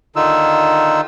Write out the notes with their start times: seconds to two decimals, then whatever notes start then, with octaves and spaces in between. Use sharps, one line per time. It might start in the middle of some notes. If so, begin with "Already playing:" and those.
0.16 D3 D#3 D#4 F4 E6